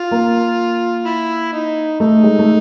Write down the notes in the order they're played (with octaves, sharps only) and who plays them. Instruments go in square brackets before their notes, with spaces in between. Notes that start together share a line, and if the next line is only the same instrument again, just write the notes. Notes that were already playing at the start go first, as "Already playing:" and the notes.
Already playing: [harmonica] F4
[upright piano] A#3
[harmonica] E4
D#4
[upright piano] A3 [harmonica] D#4
[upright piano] G#3
A3